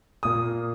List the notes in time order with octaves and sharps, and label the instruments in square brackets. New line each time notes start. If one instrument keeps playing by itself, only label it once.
[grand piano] A#2 A#3 D#6